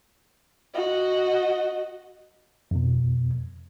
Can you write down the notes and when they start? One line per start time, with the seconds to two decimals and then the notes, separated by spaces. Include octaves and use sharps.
0.74 F#4 D#5
2.71 F2 B2